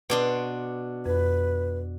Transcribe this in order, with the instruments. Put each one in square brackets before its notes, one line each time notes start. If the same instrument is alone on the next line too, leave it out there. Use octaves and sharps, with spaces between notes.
[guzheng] B2 D4 C6 [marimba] B4
[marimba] F2 [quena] B4